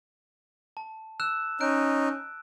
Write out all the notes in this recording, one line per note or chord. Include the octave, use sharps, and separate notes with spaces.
A5
E6 F#6 E7
C#4 D#4 F#6 D7